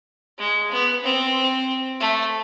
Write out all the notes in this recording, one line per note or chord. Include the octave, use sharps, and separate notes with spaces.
G#3
B3
C4
A3